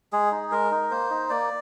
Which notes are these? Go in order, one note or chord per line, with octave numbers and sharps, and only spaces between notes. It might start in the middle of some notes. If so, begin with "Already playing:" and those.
G#3 G#4
D#4
G#3 A#4
D#4
A#3 C5
D#4
A#3 D5